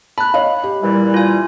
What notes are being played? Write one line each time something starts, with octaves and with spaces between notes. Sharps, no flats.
A5 B5 F#6
C#5 D#5 F5
G4
A#2 E3 G3
F4 G#5